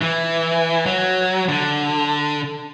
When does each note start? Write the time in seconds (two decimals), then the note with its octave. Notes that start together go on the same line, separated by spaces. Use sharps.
0.02 E3
0.86 F#3
1.49 D3